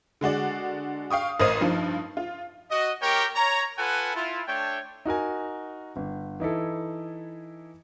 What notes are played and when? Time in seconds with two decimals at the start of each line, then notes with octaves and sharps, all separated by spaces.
0.21 D3 G#3 F#4 D5
1.11 F5 G5 C#6 D#6
1.40 A1 A#4 C5 D#5 D#7
1.61 G2 F3 D#4
2.17 F4
2.71 F#4 D#5
3.02 A#3 G4 A#4 C#5 G5
3.36 C#5 A#5
3.79 F4 A4 B4 F#5 G#5
4.14 E4 F4
4.48 A3 D4 C#5 G5
5.05 D#4 F#4 A#4 G#5
5.96 G1
6.40 E3 D#4 E4 A4